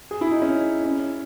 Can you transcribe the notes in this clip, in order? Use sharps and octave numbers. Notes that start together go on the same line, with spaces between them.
G#4
E4
D#4
C#4
C#4